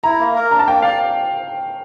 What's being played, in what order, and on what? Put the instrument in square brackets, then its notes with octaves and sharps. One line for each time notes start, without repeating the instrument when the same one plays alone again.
[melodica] E4 [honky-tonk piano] A#5
[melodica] A#3
A#4
[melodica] D4 [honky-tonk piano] A#5
[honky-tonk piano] A5
[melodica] A#3 [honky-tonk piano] G5
[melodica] D5 [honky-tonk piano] F5